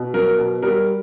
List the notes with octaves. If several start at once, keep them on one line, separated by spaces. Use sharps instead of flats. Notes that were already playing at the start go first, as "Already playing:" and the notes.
Already playing: B2
F#3 A#4
B2
G3 A#4